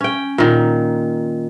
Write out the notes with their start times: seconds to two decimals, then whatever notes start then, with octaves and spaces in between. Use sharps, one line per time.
0.01 C#4 G5
0.38 A#2 D#3